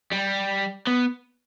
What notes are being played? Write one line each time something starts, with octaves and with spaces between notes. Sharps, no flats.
G3
B3